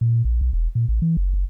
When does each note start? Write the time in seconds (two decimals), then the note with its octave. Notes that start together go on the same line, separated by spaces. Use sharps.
0.01 A#2
0.25 A#1
0.41 B1
0.53 E1
0.75 A#2
0.88 A1
1.02 E3
1.17 F#1
1.34 F#1